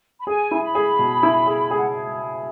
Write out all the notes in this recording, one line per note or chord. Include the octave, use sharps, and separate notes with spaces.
B5
G#4 G#5
E4
B5
G#4
B2
E4
G#4
G#4 G#5
F#5